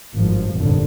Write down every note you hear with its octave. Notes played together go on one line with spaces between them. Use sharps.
G#1 G2 F3
F1 B1 G2 A#2 D3